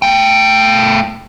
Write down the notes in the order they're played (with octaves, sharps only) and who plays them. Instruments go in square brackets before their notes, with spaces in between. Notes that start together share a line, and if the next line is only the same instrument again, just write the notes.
[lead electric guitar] A3 G5